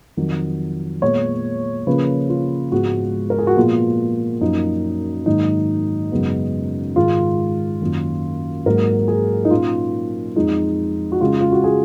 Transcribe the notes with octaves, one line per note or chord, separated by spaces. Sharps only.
F2 D#3 F#3
A#2 G#3 B3 C#5
C#3 F3 A#3 C#4 B4
F4
G#2 F3 G#3 B3 F#4
A#4
G#4
F#4
A#2 F3 G#3 B3 F4
F#2 F3 A#3 C#4 D#4
G#2 D#3 F#3 A#3 D#4
F#2 C#3 G#3 B3
G#2 D#3 G#3 F4
F#2 D#3 A#3 C#4
G#2 F#3 A#3 A#4
G#4
D#4
A#2 F#3 C#4 F4
F2 F3 G#3 D#4
F#4
C#3 G#3 C#4 F4
F4
F#4
G#4